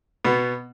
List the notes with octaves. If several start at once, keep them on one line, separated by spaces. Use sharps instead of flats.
B2 B3